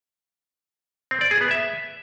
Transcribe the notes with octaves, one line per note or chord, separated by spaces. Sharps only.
C4
D5
G#4
B3
E5